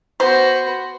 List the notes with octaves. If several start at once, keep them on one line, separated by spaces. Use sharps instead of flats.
B3 F#4 C5